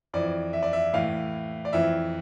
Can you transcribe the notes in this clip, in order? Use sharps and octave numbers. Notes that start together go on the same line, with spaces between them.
F2 E3 D5
E5
D5
E5
A2 E3 F5
D5
F2 E3 E5